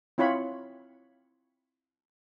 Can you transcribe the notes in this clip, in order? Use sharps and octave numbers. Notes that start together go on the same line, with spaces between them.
C4 E4 F4 C#5 B5